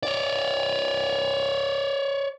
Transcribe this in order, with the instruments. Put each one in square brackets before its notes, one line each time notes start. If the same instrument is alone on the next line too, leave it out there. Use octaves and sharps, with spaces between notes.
[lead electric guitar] C#5 D5